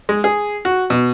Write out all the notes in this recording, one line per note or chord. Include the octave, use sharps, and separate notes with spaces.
G#3
G#4
F#4
B2